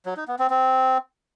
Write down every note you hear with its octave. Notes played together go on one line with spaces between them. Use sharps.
F#3
D#4
B3
C4
C4